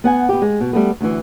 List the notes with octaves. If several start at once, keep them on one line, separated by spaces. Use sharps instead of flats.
B3 F#5 G#5
B3 G4
G#3
B2
G3 A3 B3
D2 E3